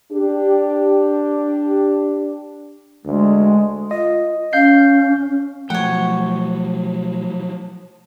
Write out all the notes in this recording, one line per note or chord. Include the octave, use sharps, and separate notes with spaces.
D4 G4
D2 G#3
F4 D#5
C#4 F5 G6 C7
B2 F3 F#3 A3 C#5 F#5 G5